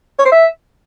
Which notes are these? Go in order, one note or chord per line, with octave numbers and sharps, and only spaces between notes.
C#5
C5
E5